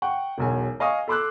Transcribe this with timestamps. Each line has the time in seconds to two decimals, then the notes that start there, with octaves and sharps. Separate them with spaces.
0.02 F#5 G5 C#6
0.38 E1 B1 G#5
0.80 D#5 F5 G#5 C#6 D#6
1.08 A4 B5 C6 D6 E6 F#6